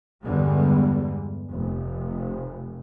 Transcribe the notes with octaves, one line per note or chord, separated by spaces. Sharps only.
E2 G2 D3 G3 G#3
F1